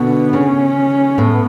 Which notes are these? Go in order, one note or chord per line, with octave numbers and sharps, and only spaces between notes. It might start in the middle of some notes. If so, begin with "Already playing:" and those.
Already playing: B2 D3 B3
C#3 C#4
A2 B3